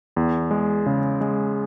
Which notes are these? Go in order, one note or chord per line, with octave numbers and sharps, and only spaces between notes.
E2
G#3
C#3
G#3